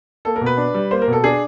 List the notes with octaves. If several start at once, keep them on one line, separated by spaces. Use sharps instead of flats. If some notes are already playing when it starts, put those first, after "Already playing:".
A#3 A4
A#4
B2
B4
D4
G3
A#3 C5
A#4
B2 A4
D4 G#4